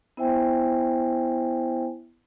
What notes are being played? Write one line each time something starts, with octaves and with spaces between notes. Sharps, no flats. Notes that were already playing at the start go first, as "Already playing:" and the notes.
B3 E4 C5 E5 G5 G#5